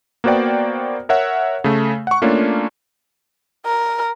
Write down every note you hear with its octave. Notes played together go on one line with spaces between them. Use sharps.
A#3 B3 F#4 C5 D5 G5
A#4 C#5 E5 F#5
C#3 A3
F#5 C#6
A3 A#3 C#4 D4 F4
A#4